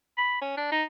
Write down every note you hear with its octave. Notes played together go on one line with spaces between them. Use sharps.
B5
C#4
D4
D#4